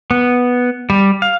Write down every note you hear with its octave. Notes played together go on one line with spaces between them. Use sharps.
B3
G3
F5